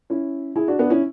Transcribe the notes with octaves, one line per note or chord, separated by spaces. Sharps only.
C#4 E4
E4 G#4
D4 F#4
B3 D4
C#4 E4